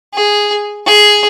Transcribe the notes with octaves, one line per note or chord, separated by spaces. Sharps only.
G#4
G#4